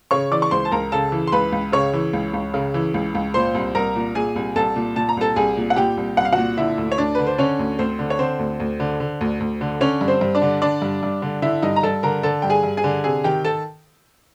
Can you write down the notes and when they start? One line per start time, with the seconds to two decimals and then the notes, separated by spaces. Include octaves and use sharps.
0.11 C#3 C#5 C#6
0.31 E3 D5 D6
0.42 C#6
0.51 C#2 C5 C6
0.65 A5
0.72 C#2 A#4 A#5
0.92 C#3 A4 A5
1.12 E3
1.27 C6
1.32 C#2 B4 B5
1.52 C#2
1.72 C#3 C#5 C#6
1.93 E3
2.13 C#2
2.34 C#2
2.54 C#3
2.74 E3
2.94 C#2
3.15 C#2
3.34 A#2 C5 C6
3.55 C2
3.75 C2 A#4 A#5
3.95 A#2
4.15 A#2 G#4 G#5
4.36 C2
4.56 C2 A4 A5
4.76 A#2
4.96 A#2 A5
5.09 A#5
5.17 C2 A4 A5
5.36 C2 G#4 G#5
5.57 A#2
5.70 F#5
5.76 A#2 G4 G5
5.97 C2
6.17 C2 F#5
6.25 F5
6.32 A#2 F#4 F#5
6.57 D3 E4 E5
6.78 D2
6.92 C#5
6.98 D2 D4 D5
7.15 D3 B4
7.27 C5
7.38 D3 C#4 C#5
7.59 D2
7.79 D2 C4 C5
7.99 D3
8.10 C#5
8.19 D3 C4 C5
8.39 D2
8.60 D2
8.80 D3
9.00 D3
9.21 D2
9.40 D2
9.61 D3
9.80 D3 C#4 C#5
10.01 G2
10.08 C4 C5
10.21 G2
10.35 D4 D5
10.42 D3
10.62 D3 D4 D5
10.82 G2
11.03 G2
11.22 D3
11.42 D3 E4 E5
11.62 G2 D#4 D#5
11.76 A#5
11.83 G2 A4 A5
12.03 D3 A#4 A#5
12.23 D3 A4 A5
12.42 G2 G5
12.50 G#4 G#5
12.63 G2
12.77 G#4 G#5
12.84 D3
13.04 C3 G#4 G#5
13.24 D#3 G4 G5
13.45 A4 A5